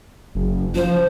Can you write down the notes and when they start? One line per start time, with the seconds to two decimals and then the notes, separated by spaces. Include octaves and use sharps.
0.35 F#1
0.75 F3 C5